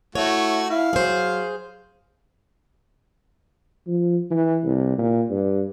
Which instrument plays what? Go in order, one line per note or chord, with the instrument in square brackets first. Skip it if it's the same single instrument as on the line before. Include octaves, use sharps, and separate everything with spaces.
[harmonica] A3 F#4 [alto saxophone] E4 [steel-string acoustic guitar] C#5
[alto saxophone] E4 [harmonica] F5
[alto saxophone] F#3 [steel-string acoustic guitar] G#4 C5
[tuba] F3
E3
C2
A#2
G2